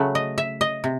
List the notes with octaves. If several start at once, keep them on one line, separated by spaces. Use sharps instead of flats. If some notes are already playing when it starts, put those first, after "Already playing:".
Already playing: C#3 F#3 A3
D#5
E5
D#5
C3